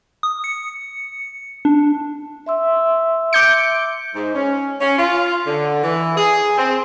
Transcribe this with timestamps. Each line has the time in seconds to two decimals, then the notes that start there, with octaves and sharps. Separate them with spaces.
0.23 D#6
0.44 C#7
1.65 D4
2.46 E5 C6 E6
3.33 D6 G6 C#7
4.15 G#2
4.35 C#4
4.81 C#4
4.98 F4
5.47 D3
5.84 E3
6.17 G#4
6.58 C4